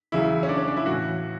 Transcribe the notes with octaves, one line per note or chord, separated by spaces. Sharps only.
E2 C#3 F#3 E4
C#4
D4
C#4
D4
E4
A2 E3 F#4